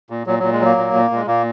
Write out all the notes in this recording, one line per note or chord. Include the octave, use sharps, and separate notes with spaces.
A#2
A#2 F#3
A#2 F#3
G#3
F#3 A#3
A#2
A#2
A#2 G#3
A#2 A#3